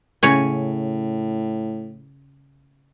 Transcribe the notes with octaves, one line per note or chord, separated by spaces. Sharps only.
A2 C#3 C#5 G#5